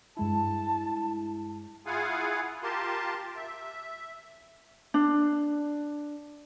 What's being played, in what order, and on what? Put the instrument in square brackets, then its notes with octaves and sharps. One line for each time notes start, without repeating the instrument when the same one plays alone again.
[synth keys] G2 G#3 E4 [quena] A5
[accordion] E4 F4 G#4 F5 F#5 G#5
F4 G4 A#4 A5 C6
E5
[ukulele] D4